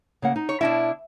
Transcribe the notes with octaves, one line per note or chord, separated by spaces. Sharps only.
C#3 A#3 F#5
D#4
C#5
B2 D4 E4 E5